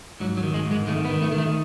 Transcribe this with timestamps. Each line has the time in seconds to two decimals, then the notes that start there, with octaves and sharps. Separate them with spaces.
0.20 G#2 F#3
0.37 F#3
0.43 D#3
0.54 G#3
0.66 G#2
0.71 G#3
0.87 D#3 A3
1.05 B3
1.10 D#3
1.22 A3
1.32 D#3
1.38 A3